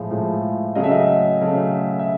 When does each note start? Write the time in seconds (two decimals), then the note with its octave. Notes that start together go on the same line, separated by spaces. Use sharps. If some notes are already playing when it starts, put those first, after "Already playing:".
Already playing: A2 F3 G#3
0.11 A2 F3 G#3
0.75 C#3 F#3 A3 D#5
0.84 E5
0.91 D#5
1.41 C#3 F#3 A3
1.99 E5